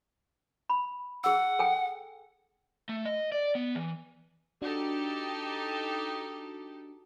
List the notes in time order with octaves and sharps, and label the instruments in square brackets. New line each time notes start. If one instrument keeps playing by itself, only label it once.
[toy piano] B5
[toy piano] G#4 E6 [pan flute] F#5
[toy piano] A4 G5 G#5
[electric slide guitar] A3
D#5
D5
B3
E3
[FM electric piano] D4 F#4 [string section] D#4 G4 A4